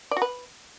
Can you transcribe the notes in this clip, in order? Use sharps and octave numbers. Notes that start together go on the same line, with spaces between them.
D5
F#4
B4